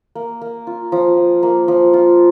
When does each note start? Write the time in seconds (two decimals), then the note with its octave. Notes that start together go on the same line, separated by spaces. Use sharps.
0.15 A#3
0.42 A#3
0.67 F4
0.92 F3
1.17 F3
1.43 A#3
1.68 F3
1.94 F4